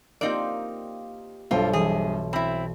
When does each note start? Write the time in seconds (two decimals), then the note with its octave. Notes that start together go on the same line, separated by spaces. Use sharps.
0.21 A#3 C4 D#4 F4 G4 D5
1.51 B1 G2 F4 A4 C5 D7
1.73 E3 G3 G#4
2.33 C4 E4 B5